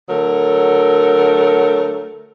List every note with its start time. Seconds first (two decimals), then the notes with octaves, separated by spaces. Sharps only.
0.09 D3 F#3 A3 A#4